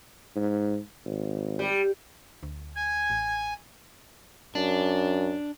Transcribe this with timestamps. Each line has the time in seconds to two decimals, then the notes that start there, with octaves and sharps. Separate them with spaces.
0.36 G#2
1.06 G#1
1.59 G3
2.43 D2
2.76 G#5 G#6
3.10 A1
4.55 F#2 D4